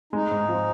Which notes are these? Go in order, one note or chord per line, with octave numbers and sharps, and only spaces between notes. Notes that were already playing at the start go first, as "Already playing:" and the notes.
G#3 D#4
G#2
F3